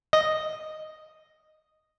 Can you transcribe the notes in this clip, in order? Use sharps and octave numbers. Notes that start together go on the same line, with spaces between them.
D#5